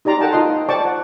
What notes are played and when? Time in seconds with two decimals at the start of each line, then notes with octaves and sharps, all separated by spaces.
0.05 D#4 G4 D5 A#5 C6
0.21 A4 A#4 F#5 G5 A5
0.33 D#4 F4 D#5 C6
0.69 C5 D5 G5 A5 C#6 D6
0.85 F#5